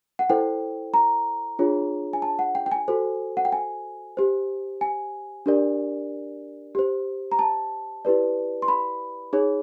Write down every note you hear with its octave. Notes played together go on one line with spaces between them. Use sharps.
F#5
E4 A4 C5 G5
A#5
D4 F4 G#4 C#5
G#5
A5
F#5
G5
G5
G#5
F#4 A4 C5
F#5
G5
G#5
G4 C5
G#5
D4 G4 A#4 D5
G4 C5
A#5
A5
E4 G4 B4 D5
C6
B5
D#4 G#4 C#5